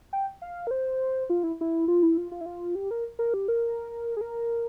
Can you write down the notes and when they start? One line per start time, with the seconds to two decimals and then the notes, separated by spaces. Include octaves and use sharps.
0.13 G5
0.42 F5
0.67 A#4
0.71 C5
1.30 F4
1.43 E4
1.61 E4
1.88 F4
2.03 E4
2.17 F4
2.32 F4
2.41 E4
2.46 F4
2.75 G4
2.91 A#4
3.19 A#4
3.34 G4
3.48 A#4
4.17 G#4
4.21 A#4